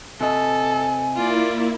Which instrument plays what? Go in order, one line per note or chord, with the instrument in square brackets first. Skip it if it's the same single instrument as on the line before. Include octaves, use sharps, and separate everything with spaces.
[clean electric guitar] C3 D#5 [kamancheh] A4 [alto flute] G#5
[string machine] A#3 E4 [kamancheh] F4 D5